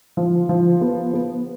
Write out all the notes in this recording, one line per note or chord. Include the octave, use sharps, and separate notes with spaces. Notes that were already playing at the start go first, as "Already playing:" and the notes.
F3
F3
B3
B3